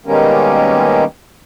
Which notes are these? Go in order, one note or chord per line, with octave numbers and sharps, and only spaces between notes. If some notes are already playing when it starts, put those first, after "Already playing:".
B2 D#3 G3 G#3 A#3 C#4